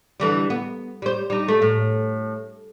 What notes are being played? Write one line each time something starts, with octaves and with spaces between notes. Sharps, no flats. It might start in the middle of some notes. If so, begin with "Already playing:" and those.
D3 E3 G3
B3
G3 C5
G3 D#4
A3
A2